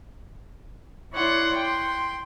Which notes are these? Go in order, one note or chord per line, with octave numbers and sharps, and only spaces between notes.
E4 C#5 D5 F#5 C6
G5 C6